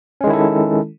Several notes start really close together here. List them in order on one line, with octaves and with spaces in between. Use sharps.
C#4 G#3 D#3 E4 A4